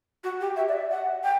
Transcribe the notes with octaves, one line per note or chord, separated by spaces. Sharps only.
F#4
G4
E5
D5
E5
F#5
G5